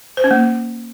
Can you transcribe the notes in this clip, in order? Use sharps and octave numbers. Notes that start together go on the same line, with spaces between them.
C5
C#4
A#3